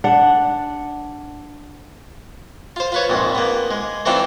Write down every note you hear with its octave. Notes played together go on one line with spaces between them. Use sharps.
D4 F#5
F4 C5
F4 B4 C#5
A#1 F2 G#2
A#3 B3
G#3
E3 A3 C4 D4 D#4 F4